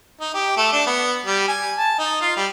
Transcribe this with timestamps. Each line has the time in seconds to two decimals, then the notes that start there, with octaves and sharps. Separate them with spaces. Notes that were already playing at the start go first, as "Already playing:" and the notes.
0.21 D#4
0.34 G4
0.57 A3
0.73 D4
0.87 B3
1.26 G3
1.48 G#5
1.78 A5
1.99 D#4
2.21 F4
2.37 G3